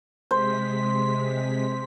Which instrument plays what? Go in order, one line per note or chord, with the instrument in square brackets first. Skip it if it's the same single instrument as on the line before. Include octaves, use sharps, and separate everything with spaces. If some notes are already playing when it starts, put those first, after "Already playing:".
[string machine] C3 G#3 B6 [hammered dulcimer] C5